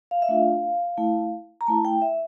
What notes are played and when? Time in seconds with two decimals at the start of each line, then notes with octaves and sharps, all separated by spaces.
0.11 F5
0.22 E5
0.29 A3 D4 F4 F5
0.98 A3 E4
1.61 A#5
1.67 A3 E4 A5
1.85 G5
2.02 E5